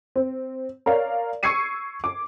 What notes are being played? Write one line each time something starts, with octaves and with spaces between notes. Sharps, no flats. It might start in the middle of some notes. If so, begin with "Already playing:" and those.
C4
A#4 C#5 D5 F5
C#6 E6 G#6 C7 C#7 D#7
D6